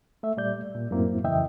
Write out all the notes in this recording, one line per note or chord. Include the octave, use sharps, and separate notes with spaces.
A3 E5
A#2 G3 D5 G6
A#2
F#2 A2 A#3 C4 E4
F2 C#3 E3 D#5 E5 G5